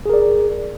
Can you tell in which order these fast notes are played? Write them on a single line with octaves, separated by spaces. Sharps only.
G#4 A#4 D5